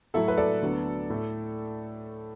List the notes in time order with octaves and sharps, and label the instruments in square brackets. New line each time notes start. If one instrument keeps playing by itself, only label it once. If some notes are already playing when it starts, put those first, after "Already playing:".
[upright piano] A2 F#3 A3 E4 A4
B4
A4 D5
D2 D3 F#3 B3
A2 A3